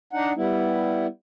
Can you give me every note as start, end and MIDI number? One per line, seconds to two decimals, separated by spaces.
0.13 0.32 62
0.13 0.32 63
0.13 0.32 78
0.36 1.06 55
0.36 1.06 59
0.36 1.06 64